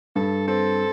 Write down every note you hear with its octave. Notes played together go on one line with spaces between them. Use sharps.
G2 A4
C4 A4